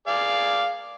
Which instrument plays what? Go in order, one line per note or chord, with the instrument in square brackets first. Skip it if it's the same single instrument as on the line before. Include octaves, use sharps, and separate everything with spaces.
[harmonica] G#4 D5 F5